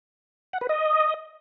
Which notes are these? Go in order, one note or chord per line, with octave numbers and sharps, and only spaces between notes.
F#5
B4
D#5